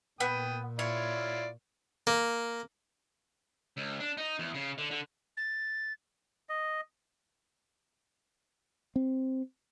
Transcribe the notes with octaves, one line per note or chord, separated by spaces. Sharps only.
A#2 B3 G5 D#6
E4 F4 C#5 D5
A#3
C#2
D4
D#4
E2
C#3
D3
D3
A6
D#5
C4